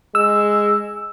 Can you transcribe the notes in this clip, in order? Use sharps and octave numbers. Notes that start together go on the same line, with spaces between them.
G#3 E6